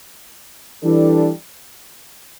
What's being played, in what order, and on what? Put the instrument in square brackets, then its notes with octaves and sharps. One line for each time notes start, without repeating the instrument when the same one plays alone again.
[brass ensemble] E3 G3 D4 A4